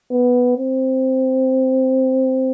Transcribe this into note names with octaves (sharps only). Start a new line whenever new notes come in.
B3
C4